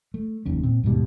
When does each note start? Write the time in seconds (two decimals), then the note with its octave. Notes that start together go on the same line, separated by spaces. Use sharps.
0.14 A3
0.46 F1 D#2 C#4
0.63 A#2 C4
0.83 D#2 G#2 B2 G3